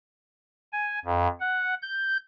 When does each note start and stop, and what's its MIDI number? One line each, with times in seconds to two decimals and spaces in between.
0.73 0.99 80
1.05 1.27 41
1.40 1.74 78
1.82 2.17 91